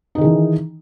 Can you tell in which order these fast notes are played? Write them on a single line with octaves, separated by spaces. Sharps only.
D#4 D#3 G#4 E3